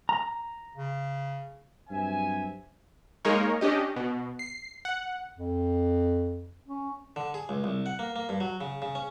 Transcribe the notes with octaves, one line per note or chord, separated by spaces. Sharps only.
A#5
C#3
G2 F#3 C4 E5 G#5
G#3 A#3 D#4 A#4 C#5
C#4 D4 G4 D#5
B2
C7
F#5
F2
C#4
D3
G#4
C#2
C2
F#5
A#3
A#3
G2
F#3
C#3
C#3
C#4